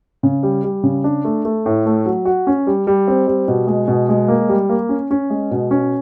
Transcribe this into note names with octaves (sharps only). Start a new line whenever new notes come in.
C#3
G3
G3
C#3
D4
A3
A3
A2
A3
F#3
F#4
C#4
G3
G3
C4
G3
B2
G#3
B2
G#3
A#3
G3
A#3
C#4
C#4
G#3
B2
C#4